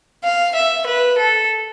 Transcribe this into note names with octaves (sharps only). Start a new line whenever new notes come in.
F5
E5
B4
A4